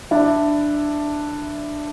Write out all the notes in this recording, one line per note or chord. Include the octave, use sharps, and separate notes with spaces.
D4 E4